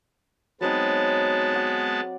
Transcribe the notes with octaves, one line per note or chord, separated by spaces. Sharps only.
F#3 G#3 B3 C4 D#4 A5
D5 F#5